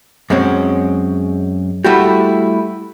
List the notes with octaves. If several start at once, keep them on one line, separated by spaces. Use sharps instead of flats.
F#2 G#3 C4 C#4
G3 A3 E4 F#4 G4